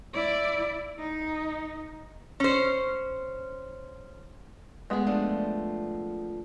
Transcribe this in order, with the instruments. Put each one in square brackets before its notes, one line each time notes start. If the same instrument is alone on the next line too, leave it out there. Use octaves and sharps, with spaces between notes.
[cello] E4 D5
D#4
[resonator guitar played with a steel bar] C#4 C5
[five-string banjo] G#3 B3 [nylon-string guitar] A3 G#4
[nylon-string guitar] F3 A3 D4